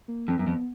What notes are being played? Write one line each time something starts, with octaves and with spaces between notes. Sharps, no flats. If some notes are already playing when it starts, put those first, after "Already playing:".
A#3
F2 C4
F#2 B3
F2